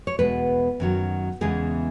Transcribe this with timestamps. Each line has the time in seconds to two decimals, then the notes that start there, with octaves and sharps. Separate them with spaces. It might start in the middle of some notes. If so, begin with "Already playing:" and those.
0.07 C#5
0.19 E2 B2 G#3 B3 B4
0.80 F#2 D#3 F#3
1.41 E2 C#3 E3 G#3 G#4